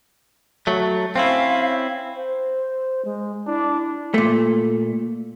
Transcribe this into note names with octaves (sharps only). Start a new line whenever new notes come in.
F#3 A3
C4 C#4 E4 F5
C5
G#3
D4 E4
A#2 A3